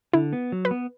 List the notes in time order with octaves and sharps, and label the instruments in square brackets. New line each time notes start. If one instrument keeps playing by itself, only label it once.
[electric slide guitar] D3 [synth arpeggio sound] E4
[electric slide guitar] B3
F#3
[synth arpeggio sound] B4
[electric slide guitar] B3